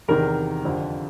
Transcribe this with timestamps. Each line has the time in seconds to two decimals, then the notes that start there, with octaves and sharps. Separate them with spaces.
0.08 E2 C3 D#3 A#4
0.65 F2 D3 F3